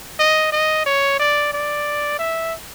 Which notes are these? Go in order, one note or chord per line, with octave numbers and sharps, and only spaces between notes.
D#5
D#5
C#5
D5
D5
E5